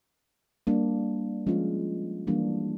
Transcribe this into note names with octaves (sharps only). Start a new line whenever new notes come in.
G3 A#3 D4
F3 G#3 C#4 F4
E3 G3 A#3 D4